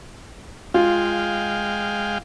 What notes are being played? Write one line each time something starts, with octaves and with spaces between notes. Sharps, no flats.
G#3 F4 F5 G5